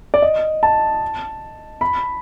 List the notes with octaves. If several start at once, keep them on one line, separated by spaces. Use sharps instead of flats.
D5
D#5
A5
B5